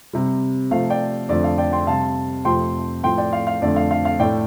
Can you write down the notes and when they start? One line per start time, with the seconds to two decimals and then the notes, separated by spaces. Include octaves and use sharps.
0.13 C3 G3
0.71 C3 F3 A3 F5
0.90 D5 G5
1.29 F2 D3 F3 A3 D5
1.44 F5
1.58 D5 G5
1.73 G5 C6
1.87 C3 G3 F5 A5
2.45 F2 C3 F3 A3 G5 C6
3.04 A2 F3 A3 G5 C6
3.18 D5 G5
3.33 F5
3.47 F5
3.62 F2 D3 A3 D5
3.76 F5
3.91 F5
4.05 F5
4.19 A2 A3 D5 G5